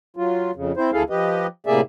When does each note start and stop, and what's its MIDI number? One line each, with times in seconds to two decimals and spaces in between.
0.16 0.51 54
0.16 0.51 65
0.55 0.72 41
0.55 0.72 49
0.77 0.91 60
0.77 0.91 64
0.77 0.91 72
0.93 1.03 38
0.93 1.03 57
0.93 1.03 64
0.93 1.03 68
0.93 1.03 69
0.93 1.03 77
1.10 1.47 53
1.10 1.47 67
1.10 1.47 71
1.10 1.47 75
1.66 1.81 45
1.66 1.81 48
1.66 1.81 58
1.66 1.81 68
1.66 1.81 74
1.66 1.81 76